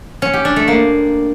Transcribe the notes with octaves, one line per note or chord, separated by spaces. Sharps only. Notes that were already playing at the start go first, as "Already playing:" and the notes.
C#4
G4
D4
A3
A#3